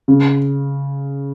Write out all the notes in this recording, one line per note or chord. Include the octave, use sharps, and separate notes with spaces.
C#3